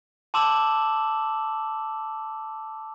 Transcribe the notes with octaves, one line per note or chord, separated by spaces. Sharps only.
A5 C6 D6 E6 E7 F#7